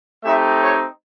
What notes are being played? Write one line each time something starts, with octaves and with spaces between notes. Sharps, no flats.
A3 C4 D#4 G4 E5
C#5